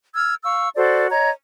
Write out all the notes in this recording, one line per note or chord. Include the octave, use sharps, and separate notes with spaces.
E6 F6 G#6
F5 C#6 E6
F#4 A4 C5 D5
C#5 D#5 A#5